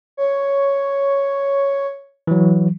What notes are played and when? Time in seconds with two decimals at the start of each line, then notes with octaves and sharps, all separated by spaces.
0.17 C#5
2.27 E3 F#3